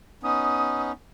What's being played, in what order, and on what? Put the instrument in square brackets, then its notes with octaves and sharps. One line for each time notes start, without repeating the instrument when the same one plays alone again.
[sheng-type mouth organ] B3 C#4 D#4 [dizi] D#6